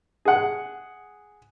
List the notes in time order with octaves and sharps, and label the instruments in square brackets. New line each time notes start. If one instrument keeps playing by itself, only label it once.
[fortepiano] G#4 F#5